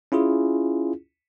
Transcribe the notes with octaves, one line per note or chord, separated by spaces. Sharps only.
C#4 E4 F4 G#4